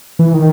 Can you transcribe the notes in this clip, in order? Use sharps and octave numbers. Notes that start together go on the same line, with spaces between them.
E3
D#3